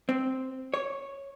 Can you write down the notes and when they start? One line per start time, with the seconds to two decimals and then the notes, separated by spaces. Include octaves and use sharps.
0.09 C4
0.74 C#5